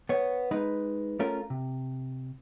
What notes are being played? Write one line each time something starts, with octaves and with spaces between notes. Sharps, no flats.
B3 C#5
G#3 D#4 B4
A3 C#4 F4 A#4
C3